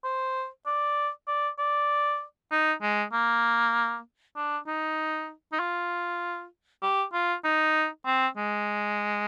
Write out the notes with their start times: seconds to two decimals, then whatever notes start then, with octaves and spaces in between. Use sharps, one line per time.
0.04 C5
0.66 D5
1.27 D5
1.59 D5
2.51 D#4
2.82 G#3
3.13 A#3
4.36 D4
4.67 D#4
5.52 D#4
5.59 F4
6.82 G4
7.13 F4
7.44 D#4
8.06 C4
8.37 G#3